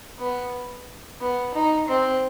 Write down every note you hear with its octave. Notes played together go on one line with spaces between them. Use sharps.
B3
B3
D#4
C4